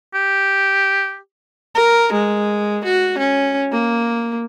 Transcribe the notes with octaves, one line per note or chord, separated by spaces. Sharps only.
G4
A#4
G#3
F#4
C#4
A#3